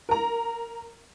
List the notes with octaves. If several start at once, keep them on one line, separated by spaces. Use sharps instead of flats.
A#4 A#5